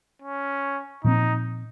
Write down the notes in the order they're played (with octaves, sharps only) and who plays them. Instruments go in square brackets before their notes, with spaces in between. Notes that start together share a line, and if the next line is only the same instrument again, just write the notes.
[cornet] C#4
[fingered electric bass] A#2 F3 C4 [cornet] D#4